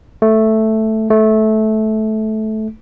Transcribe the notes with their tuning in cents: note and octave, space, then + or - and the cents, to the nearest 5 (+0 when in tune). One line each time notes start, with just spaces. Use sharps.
A3 +0
A3 -15